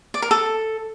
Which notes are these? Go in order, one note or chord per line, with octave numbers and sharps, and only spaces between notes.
D5
A#4
A4